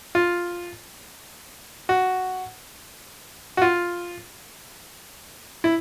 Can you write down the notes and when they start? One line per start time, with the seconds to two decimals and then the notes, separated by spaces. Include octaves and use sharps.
0.15 F4
1.89 F#4
3.57 F#4
3.62 F4
5.64 E4